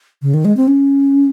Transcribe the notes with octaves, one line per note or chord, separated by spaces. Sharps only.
C#3
D#3
G#3
C4
C#4